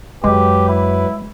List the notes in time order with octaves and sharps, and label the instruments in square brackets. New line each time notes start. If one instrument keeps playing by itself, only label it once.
[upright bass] F#2 [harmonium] F#3 B4 [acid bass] G#3 [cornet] G4
[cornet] E4